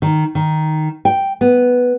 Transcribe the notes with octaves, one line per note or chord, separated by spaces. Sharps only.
D#3
D#3
G5
B3